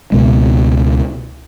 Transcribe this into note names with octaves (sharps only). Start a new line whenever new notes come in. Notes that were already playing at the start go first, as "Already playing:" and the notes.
C#2 B2 G#3